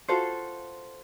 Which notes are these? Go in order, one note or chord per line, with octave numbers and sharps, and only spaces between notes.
F4 F#4 A4 C5